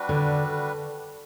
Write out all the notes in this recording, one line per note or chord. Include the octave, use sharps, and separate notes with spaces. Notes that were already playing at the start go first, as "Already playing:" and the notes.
Already playing: G3 D4 F#4 B4
D3